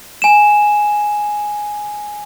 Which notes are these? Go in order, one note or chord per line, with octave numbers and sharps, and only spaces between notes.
G#5 E7